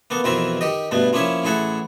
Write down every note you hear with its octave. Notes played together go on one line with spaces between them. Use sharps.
A#3 B3 A4
F2 B2 E3 C4 A#4 E5
D#3 G4 D#5
G2 B2 A3 B3
F3 A#3 C#4 E4 C#5 E5
A1 E4 G#4 A4 F#5